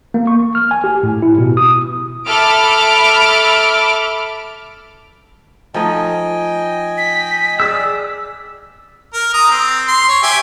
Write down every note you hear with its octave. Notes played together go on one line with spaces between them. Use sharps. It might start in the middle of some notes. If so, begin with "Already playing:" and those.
A#3
C#6
F6
G#5
G4
A2
E4
B2
D#6
A4 E5 B5 D6 F6 D7
F3 A3 D#4 D#5 G5 G#5
B6
G#4 D5 E6
A#4
A#5 D#6
C4
C6
C#5
G4 E5 G#5